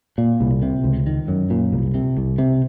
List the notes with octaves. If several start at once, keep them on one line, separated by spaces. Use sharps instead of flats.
A#2
C2
C3
C#2
D#3
F#2
A#2
C2
C3
C2
C3